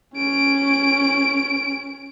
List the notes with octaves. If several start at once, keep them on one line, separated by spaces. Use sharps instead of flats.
C#4 D7